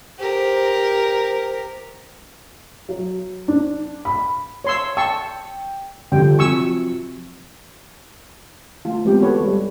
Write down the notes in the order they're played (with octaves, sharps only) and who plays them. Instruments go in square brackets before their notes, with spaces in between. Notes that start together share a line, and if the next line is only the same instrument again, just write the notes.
[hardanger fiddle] G4 A#4 [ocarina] C5
[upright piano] F#3
D4
B5
[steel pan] C#5 C6 E6
[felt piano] G5 [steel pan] A5 C#6 E6
[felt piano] D3 F3 G3 [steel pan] G5
[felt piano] C3 F3 F#3 [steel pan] G#5 C#6 E6
[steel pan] A3 F4
G#3 B3 C4 G4 G5
F#4 A4 B4 C#5
G3